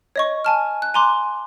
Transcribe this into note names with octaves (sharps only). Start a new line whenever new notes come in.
C#5 D#5 C#6
G#5 A5 F6
F#6
G#5 A#5 C6 D6 F#6